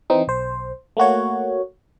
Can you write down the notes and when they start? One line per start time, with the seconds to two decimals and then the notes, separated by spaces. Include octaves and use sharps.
0.10 E3 C4 D#4
0.27 B1 C5
0.97 A3 A#3 F#4 C#5